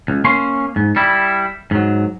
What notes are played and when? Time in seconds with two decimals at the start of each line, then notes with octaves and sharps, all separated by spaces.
0.08 C#2
0.25 A#3 C#4 C6
0.76 G#2
0.96 G3 E4
1.71 G#2 F#3